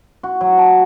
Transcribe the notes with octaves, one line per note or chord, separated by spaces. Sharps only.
F#4
F#3
A5